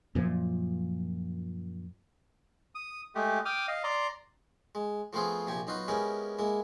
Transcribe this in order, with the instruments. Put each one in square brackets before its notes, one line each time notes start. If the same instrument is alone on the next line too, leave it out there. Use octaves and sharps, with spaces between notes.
[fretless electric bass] F#2 A#2 F3
[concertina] D#6
G#3 A3 G4
G5 D6 D#6 F6
D#5 F5
D5 A#5 C6
[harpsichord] G#3
F3 A3 B3 C4 F4 G#4
A#1 C3 F3 G4 G#5
B1 D#4 F4 F#4 B4
G#3 B3 C#4 E4 G4 A#4
G#3 A#3 E4